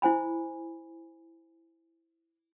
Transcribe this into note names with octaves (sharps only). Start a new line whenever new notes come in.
E4 C5 G#5 B5